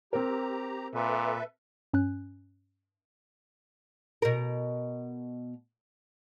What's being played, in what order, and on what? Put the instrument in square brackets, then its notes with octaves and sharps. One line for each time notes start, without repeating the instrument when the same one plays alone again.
[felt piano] C4 A#4 [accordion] G4 A#5
[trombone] A#2 [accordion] A4 B4 E5
[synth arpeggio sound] G2 C#4 G#5 F#6
[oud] B2 A#4